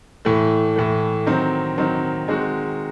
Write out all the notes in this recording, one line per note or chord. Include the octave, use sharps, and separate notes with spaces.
A2 E3 A3
A2 E3 A3
D#3 F#3 C4
D#3 F#3 C4
D#3 G#3 C4 F#4